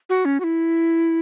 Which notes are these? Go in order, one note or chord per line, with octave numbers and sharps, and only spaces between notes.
F#4
C#4
F#4
E4